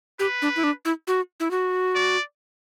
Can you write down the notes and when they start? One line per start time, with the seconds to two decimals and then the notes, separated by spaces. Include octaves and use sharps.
0.19 G4 B4
0.42 D4
0.56 E4
0.64 D4
0.85 E4
1.07 F#4
1.40 E4
1.51 F#4
1.95 D5